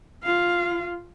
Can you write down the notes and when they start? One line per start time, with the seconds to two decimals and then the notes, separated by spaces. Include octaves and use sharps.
0.23 F4 F5